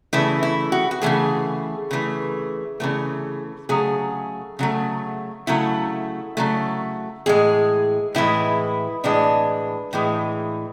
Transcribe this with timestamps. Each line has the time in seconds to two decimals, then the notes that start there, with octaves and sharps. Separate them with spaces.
0.13 C#3 E3 A3 E4
0.43 E4
0.72 F#4
0.91 F#4
1.02 C#3 E3 A3 G#4
1.91 C#3 E3 A3
2.80 C#3 E3 A3
3.69 C#3 F#3 A3 G#4
4.59 C#3 F#3 A3
5.47 C#3 F#3 A3 E4
6.37 C#3 F#3 A3
7.26 A2 E3 G#3 G#4
8.15 A2 E3 G#3 E4
9.04 A2 E3 G#3 D4
9.93 A2 E3 G#3